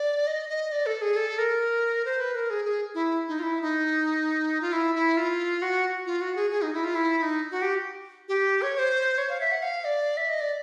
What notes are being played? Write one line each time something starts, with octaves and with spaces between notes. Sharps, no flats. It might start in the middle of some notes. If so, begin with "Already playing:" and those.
Already playing: D5
D#5
D#5
D5
A4
G#4
A4
A#4
C5
B4
A#4
G#4
G#4
E4
D#4
F4
E4
D#4
F4
E4
E4
F4
F#4
F4
F#4
G#4
G#4
D#4
E4
F4
E4
E4
D#4
F#4
G4
G4
C#5
C#5
C5
C#5
F5
E5
F#5
F5
D5
E5
D#5
D5